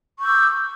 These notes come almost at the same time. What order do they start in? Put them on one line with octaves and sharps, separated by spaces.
C#6 G6 E6 D6